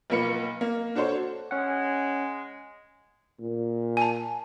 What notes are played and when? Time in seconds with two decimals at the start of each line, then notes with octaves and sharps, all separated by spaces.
0.10 B1 F3 A#3 B4 C#7
0.61 A#3
0.95 D4 F#4 A4 C5 C#5
1.51 G#3 C#4 F#5
3.40 A#2
3.97 G#5 A5